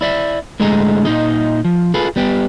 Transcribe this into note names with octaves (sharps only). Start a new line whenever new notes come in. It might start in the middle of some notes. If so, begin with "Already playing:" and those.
E4 D5 E5
A2 D3 G#3 G#4 D#5 A#5
A#2 D#4 D#5
F3
F4 G#4 A4 B4
G3 B3 G4